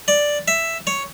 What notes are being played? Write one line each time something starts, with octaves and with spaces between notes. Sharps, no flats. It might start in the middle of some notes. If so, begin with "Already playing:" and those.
D5
E5
C#5